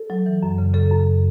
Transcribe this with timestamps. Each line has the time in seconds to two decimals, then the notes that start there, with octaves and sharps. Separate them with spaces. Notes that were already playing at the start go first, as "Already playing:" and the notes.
Already playing: A4
0.10 F#3
0.26 E3
0.43 F#2
0.58 C#3
0.74 C#3 A4
0.91 F#2